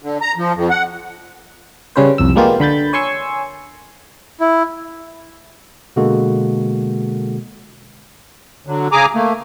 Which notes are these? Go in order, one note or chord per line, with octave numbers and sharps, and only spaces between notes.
D3
A#5
F3
F2
F#5
C#3 G3 C#4 B4 C5
C2 F2 E6
G3 G#3 A#3 B3 F4 G4
D3 B5 G6 A6
C#5 G#5 C6 C#6 E6
E4
B2 D3 G#3 A#3 F#4 A4
D3 F#3
C#3 G#4 G#5 A#5 D6
A3 A#3